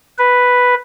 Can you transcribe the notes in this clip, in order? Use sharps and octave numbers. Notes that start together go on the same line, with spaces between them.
B4